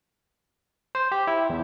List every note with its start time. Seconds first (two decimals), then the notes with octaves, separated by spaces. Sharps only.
0.95 C5
1.12 G4
1.27 E4
1.50 E2